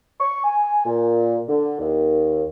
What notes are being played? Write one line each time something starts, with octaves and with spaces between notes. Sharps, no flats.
C#6
G#5
A#2
D3
D#2